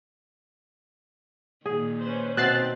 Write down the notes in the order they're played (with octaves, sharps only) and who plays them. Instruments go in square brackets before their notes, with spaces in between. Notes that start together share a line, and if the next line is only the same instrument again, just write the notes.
[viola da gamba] A#2 D#3 [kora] G#4
[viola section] C#4 B4 C5
[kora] B2 E5 [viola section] C4 D#4 [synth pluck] F#6 A6 C7